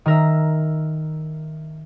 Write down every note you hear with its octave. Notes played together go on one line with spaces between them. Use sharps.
D#3 A#4 E5